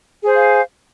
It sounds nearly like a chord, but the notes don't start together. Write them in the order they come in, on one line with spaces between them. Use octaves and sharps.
G#4 C5 G#5 F5